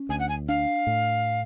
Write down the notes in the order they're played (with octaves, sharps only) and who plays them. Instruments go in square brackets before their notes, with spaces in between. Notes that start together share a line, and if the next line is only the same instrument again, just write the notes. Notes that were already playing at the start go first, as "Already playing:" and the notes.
Already playing: [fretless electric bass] C#4
[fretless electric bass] D2 [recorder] G#5
[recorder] F#5
G#5
[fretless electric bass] D4 [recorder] F5
[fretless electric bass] A2